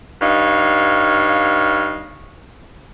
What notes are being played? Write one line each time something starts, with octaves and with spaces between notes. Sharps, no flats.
G2 D#4 C#5 F5